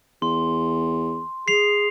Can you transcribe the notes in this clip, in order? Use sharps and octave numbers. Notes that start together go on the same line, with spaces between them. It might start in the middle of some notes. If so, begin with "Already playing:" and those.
E2 C6
G#4 C7 F7